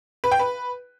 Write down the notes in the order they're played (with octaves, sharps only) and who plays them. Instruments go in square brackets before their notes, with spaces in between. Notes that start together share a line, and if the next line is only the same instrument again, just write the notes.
[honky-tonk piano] B4
G5
B4